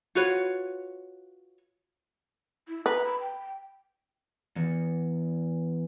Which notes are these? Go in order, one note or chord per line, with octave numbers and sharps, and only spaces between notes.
F4 F#4 B4 C#5
E4
B4 A#5
B5
G5
E2